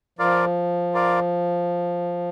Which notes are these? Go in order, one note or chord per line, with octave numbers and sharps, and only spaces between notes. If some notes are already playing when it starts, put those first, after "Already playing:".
F3 F4 A#4 D5 F5
F4 A#4 D5 F5